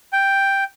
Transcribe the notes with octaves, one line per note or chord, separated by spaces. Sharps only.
G5